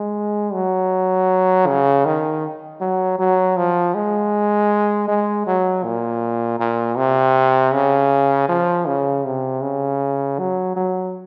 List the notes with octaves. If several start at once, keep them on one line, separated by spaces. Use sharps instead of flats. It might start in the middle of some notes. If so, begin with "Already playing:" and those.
Already playing: G#3
F#3
C#3
D#3
F#3
F#3
F3
G#3
G#3
F#3
A#2
A#2
C3
C#3
F3
C#3
C3
C#3
F#3
F#3